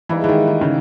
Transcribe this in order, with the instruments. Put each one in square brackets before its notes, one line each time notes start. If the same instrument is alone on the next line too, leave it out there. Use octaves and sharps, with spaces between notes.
[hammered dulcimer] G#2 G3 A#3 E4 [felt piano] E3
[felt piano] E3
D#3
D#3
C#3